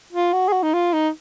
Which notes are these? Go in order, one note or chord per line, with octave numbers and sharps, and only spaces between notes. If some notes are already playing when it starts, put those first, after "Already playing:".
F4
F#4
G#4
F#4
D#4
F4
D#4